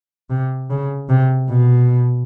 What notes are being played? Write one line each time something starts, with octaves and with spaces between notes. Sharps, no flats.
C3
C#3
C3
B2